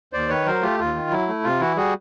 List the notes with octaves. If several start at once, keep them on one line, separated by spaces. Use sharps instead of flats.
D#2 C5 D5
D#3 B4 C#5
F#3 A#4 C5
A3 F4 G4
D#2 F4
D#3
F#3 E4
A3
C3 F4
E3 E4 F#4
G3 F#4 G#4